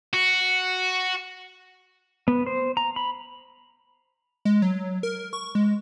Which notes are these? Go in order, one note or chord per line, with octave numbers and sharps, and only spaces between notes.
F#4
B3
C5
A#5
B5
G#3
F#3
A#4
C#6
G#3